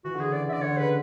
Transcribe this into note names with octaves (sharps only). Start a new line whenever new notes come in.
E3 F#4
D3
C#3 G#4
E3 D5
D3 D5 E5
D3 C#5
C#3 B4